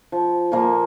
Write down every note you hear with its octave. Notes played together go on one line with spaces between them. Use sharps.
F3
A#2 F3 A#3 C6